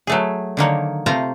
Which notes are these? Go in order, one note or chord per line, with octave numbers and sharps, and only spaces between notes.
F#3 A3 G#4
D3 D#3 A#3 C#5
C3 A3 F4 C5 A#5